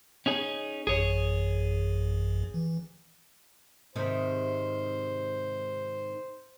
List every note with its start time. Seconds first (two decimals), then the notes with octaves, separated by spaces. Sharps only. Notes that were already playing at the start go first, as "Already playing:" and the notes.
0.26 C#4 D#4 G#4
0.87 A1 F#2 G#4 C#5
2.54 E3
3.96 G#2 C3 D#3 C5